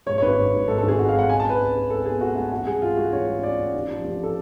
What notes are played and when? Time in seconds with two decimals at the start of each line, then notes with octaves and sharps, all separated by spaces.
0.06 G#2 C#5
0.18 C#5
0.22 G#1 B4
0.38 G#1
0.53 G#1
0.68 G#2 A4
0.78 A4
0.83 G#1
0.88 G#4
0.98 G#1 F#4
1.09 F5
1.14 G#2
1.19 F#5
1.29 C#2 G#5
1.40 A5
1.45 C#2
1.50 B4
1.59 C#2
1.75 C#2
1.90 C#2 A4
2.05 B2 G#4
2.21 A3 F#4
2.36 C#2 F#4
2.52 A1 F#4
2.67 G#3 G#4
2.82 G#2 F4
2.97 G#3 F#4
3.12 A1 C#5
3.28 G#3
3.43 A1 D5
3.58 A1
3.73 F1
3.89 F3
4.04 F1
4.23 A4